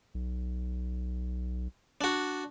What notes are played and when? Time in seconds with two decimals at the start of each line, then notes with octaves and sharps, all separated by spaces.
0.15 B1
2.01 D4 F#4